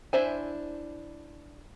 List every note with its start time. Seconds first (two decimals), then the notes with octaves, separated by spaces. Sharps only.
0.13 D4 E4 C5 E5 G#5